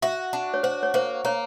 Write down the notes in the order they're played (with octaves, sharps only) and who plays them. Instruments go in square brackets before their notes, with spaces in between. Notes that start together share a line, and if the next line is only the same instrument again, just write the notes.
[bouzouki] F#4 [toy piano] E5
[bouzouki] D4
[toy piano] C#5
[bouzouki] F#4 [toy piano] C5
[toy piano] C#5
[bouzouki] A#3 [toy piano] C5
[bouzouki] A#3 [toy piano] C#5